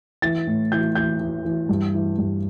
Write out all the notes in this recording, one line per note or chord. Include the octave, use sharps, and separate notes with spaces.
E3 A6
A2
E3 G6
E3 G6
E3
E3
G2
E3
G2